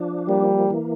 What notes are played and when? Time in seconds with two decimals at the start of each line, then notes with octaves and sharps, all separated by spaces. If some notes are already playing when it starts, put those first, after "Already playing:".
Already playing: F3 D4
0.28 G3 A#3
0.70 E3